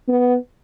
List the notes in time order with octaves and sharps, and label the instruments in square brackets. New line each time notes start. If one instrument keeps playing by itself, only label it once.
[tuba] B3